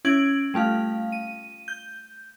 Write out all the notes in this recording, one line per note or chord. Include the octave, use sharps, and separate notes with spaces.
C#4 E4 G#6 D7 F#7
G3 A3 F4 F5
D#7
G6